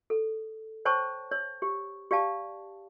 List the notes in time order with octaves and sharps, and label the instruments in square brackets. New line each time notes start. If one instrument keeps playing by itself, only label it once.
[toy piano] A4
C5 C#5 G5 A5 C#6
C#5
G4
G4 D5 F5 A5